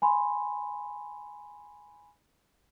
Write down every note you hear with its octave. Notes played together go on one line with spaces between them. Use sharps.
G#5 B5 C6